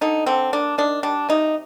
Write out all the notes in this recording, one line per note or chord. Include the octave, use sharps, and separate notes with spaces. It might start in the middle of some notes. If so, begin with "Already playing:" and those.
D3 D#4
D3 C4
A#3 D4
D#3 D4
G3 D4
C3 D#4